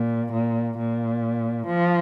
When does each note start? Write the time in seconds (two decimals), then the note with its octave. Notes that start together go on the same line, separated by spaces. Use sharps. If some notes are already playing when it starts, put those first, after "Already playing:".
Already playing: A#2
0.33 A#2
0.78 A#2
1.67 F3